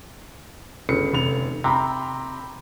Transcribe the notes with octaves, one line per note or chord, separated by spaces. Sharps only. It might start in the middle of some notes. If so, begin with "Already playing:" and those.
G1 C#2 C#7
F1 F7
C3 G5 A#5 B5